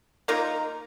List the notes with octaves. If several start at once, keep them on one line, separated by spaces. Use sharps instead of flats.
A#3 D#4 F4 A#4